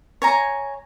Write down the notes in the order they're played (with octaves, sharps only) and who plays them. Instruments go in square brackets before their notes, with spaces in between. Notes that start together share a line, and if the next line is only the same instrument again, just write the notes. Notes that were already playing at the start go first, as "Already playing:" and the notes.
[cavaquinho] C#5 G#5 A#5